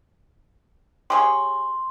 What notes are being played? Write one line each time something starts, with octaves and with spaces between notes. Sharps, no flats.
G4 G#4 C#5 C6